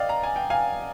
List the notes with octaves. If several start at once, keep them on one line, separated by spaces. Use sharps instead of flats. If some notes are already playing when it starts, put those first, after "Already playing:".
Already playing: D5 D#5 F5 G5
A#5
G#5
G5
F5 G#5